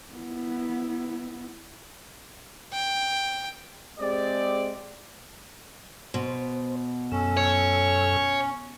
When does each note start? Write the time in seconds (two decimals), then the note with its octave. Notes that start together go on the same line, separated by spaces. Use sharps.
0.13 B3 E4
2.73 G5
3.99 G#3 C4 G4 G#4 D5
6.14 B2 C5
7.12 F#2 C#4 A4 E6
7.37 C#5